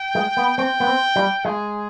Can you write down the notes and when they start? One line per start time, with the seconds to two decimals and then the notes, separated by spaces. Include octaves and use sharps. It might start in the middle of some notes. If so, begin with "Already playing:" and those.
Already playing: G5
0.15 G#3
0.37 B3
0.58 C4 G5
0.80 B3
0.87 C4
1.16 G3
1.45 G#3 G#4